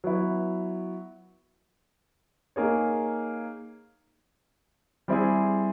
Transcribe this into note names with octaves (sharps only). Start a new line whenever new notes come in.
F#3 B3 E4
A#3 D#4 G#4 C#5
G3 C4 E4 G#4